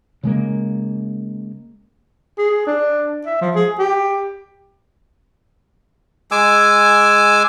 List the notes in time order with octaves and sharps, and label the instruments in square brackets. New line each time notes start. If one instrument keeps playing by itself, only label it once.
[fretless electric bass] C#3 G#3 A#3
[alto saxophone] G#4
D4
E5
F3
G#4
G4
[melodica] G#3 G#5 D6 E6